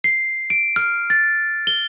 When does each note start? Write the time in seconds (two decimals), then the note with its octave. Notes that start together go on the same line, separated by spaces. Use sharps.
0.04 C7
0.50 D7
0.76 F6
1.10 A6
1.67 G7